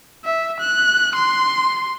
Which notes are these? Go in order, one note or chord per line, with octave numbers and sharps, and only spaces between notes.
E5
F#6
C6